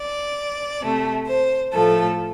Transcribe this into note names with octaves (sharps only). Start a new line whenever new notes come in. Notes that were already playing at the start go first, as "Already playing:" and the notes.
Already playing: D5
C3 A3
C5
A2 F3 A3 A4